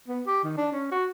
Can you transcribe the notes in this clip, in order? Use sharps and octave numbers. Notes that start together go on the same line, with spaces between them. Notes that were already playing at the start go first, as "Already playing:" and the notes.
B3
G4
D#3
D4
C#4
F#4